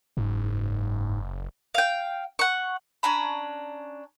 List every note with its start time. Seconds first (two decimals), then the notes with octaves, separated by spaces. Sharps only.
0.17 F#1 G#2
1.74 F5 G5
2.39 F#5 C#6
3.03 C#4 D4 A#5 B5